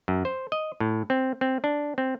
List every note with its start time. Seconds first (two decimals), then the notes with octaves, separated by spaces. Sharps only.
0.08 F#2
0.25 C5
0.52 D#5
0.80 A2
1.10 C4
1.41 C4
1.64 D4
1.98 C4